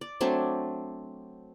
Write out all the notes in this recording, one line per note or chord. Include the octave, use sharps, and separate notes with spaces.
D5
F#3 A3 C4 D4